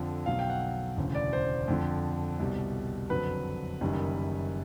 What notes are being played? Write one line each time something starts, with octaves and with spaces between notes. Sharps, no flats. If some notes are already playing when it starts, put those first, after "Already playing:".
Already playing: F2 D3 F3
B1 B2 F#3 F5
G5
F#5
E1 D2 C#3 E3
D5
C5
F2 D3 F3
C2 B2 G3
F#1 F2 D3 F#3 B4
F#1 F#2 D#3 G3